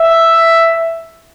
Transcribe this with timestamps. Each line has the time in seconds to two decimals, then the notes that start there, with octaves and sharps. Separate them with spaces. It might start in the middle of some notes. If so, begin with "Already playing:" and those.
Already playing: E5